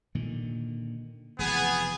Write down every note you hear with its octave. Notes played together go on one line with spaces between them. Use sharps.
A#2 D3 D#3
F1 B2 E3 B3 G#4